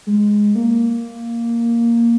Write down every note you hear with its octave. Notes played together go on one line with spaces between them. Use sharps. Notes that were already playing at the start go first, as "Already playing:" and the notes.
G#3
A#3